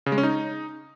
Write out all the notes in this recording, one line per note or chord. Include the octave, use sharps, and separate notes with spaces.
C#3
G#3
C#4
D#4